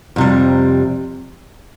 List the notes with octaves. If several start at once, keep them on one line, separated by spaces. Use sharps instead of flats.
F2 C3 G3